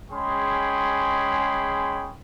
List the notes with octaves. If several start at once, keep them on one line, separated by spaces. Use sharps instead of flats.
G#3 C#4 G#4 G5 B5 C6